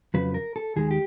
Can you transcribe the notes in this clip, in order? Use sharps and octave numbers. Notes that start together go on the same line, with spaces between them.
F2 C#3 F#3 B4
A#4
A4
D#2 D#3 G#3 G#4
G4